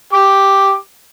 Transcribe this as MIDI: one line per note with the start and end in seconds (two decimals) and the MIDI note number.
0.13 0.75 67
0.13 0.75 86